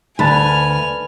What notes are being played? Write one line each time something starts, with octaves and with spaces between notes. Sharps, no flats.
D2 B4 G#5 A5 F6